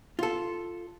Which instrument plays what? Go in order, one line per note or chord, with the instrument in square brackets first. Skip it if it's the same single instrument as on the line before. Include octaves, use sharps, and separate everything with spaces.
[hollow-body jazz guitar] F4 A4